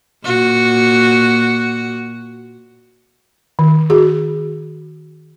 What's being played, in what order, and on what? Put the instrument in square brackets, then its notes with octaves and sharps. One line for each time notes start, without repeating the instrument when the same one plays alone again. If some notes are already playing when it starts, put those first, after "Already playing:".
[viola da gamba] A#2 F#4
[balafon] D#3
F#4 G#4